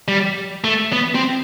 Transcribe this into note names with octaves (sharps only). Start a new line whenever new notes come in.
G3
A3
B3
C4